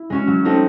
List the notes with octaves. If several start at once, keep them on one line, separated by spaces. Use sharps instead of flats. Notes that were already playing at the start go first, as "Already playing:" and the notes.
Already playing: E4
G#3 C#4 F#4
F#3
A3 C4 D#4 F#4